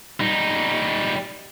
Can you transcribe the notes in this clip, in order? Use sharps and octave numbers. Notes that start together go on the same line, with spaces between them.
G3 D#4